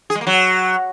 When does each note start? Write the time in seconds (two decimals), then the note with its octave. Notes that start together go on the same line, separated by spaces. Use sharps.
0.10 G#4
0.15 G#3
0.21 A#3
0.27 F#3